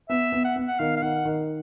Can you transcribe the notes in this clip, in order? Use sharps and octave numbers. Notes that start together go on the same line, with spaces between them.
B3 E5
B3
F#5
B3
F#5
D#3 F5
F5
D#3 F#5
D#3